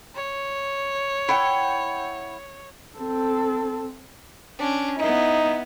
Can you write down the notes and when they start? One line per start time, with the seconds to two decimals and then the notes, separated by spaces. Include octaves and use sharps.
0.15 C#5
1.29 E4 F#5 G5
2.98 C4 A4
4.58 C#4 D4
4.99 B3 D#4 E4